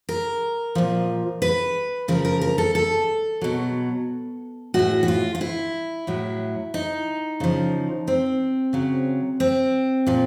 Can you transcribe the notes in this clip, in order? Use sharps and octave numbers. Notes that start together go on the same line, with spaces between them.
A#4
A#2 F3
B4
C#3 F3 A#4
A#4
A#4
A4
A4
B2 F#3
A2 E3 F#4
F#4
F4
F4
E4
A2 F#3
D#4
C#3 F3
C4
C#3 F#3
C4
A#2 F3